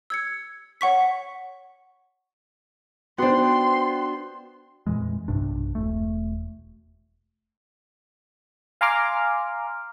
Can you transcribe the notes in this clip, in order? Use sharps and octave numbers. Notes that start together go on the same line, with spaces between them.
E6 G#6 C#7
C#5 F#5 C#6 B6
B3 D4 F#4 C5 G5 C6
F2 A#2 E3 G#3
B1 G2 C3 D4
E1 A3
F5 G#5 A#5 C6 D6 F6